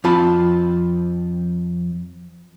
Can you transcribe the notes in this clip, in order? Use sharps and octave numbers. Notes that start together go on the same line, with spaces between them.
F2 C4 F4 A5 B5